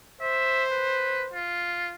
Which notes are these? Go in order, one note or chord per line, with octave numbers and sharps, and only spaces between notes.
C5 E5
B4
F4